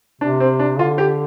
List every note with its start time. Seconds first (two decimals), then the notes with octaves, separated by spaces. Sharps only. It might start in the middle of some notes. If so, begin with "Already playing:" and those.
0.21 C3 D4
0.40 C4
0.60 D4
0.78 D3 F4
0.98 G4